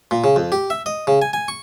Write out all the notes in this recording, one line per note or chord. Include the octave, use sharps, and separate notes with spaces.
A#2
C#3
F2
G4
E5
D#5
C#3
G#5
G#5
C#6